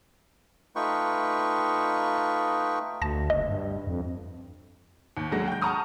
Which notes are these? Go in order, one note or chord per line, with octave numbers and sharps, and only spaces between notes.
A3 D#4 F4 B4 G5 C#6
D2 A5 A#6
F#1 D#5
G2
F2
D#2
D2 D3 F#3 G#3 A#6
G5 G6
F#5 A5 A#5 C#6 D#6 F6